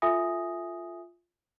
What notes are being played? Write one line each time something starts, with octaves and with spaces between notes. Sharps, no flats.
F4 A4 E5 G#5 D#6 A#6